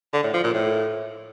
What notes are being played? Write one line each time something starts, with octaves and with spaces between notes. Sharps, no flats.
D3
A2
F3
A#2
A2